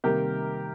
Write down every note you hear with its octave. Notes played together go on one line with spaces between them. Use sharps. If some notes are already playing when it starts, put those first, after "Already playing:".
C3 D#3 G3 A#3 G4 A#4